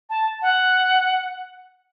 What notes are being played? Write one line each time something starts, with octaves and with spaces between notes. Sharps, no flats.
A5
F#5